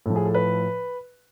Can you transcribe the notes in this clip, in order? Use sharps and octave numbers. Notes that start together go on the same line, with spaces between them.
A2 F3 A4
G#4
A4
B4